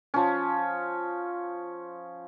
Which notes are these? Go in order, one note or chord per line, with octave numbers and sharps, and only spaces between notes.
F3 C#4